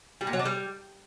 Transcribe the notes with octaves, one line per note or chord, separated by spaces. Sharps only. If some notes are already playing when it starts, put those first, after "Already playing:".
G3
A#2
F#3
D4
G3